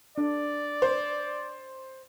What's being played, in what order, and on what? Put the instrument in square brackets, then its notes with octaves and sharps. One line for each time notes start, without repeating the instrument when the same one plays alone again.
[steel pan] D4 [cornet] D5
[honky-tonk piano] C5